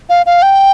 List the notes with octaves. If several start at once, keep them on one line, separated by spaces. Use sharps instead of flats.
F5
F5
G5